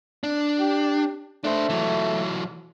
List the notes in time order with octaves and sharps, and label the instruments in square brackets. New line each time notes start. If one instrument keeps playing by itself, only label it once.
[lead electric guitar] D4
[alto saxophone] G4
[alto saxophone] A3 [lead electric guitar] D4 C5
[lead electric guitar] E3 F#3